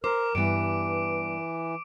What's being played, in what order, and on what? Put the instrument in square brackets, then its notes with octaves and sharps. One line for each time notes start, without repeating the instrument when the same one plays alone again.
[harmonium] A#4 [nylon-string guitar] C5 [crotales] D6
[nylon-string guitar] G2 B3 [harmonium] E3 [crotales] D7